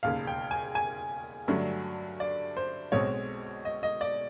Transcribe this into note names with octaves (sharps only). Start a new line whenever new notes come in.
E1 D#2 C#3 F5
G5
G#5
G#5
G2 D3 F#3 A3
D5
C5
B1 B2 G#3 C4 C#5
D#5
D#5
D5